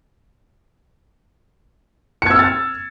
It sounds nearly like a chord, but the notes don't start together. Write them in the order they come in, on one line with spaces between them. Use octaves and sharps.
C#7 G#6 E6 F6 A6